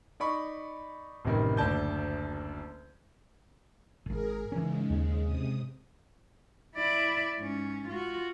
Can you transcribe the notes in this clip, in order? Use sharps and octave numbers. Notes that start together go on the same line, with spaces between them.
D#4 D5 B5 C#6
A1 F#2 C3 D#3 G3
F#1 D2 D5 A5 G6
D#1 G#1 G#4 A#4
G#2 C#3 E3 G#3 C#4
D#2
C3 D#6
E4 D5
G#2 C#4
F4 F#4